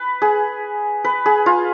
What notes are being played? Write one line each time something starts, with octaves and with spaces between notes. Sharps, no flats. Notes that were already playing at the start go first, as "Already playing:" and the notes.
Already playing: B4
G#4
B4
G#4
F4